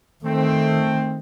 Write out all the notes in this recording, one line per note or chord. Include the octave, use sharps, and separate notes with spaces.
D#3 A3 C4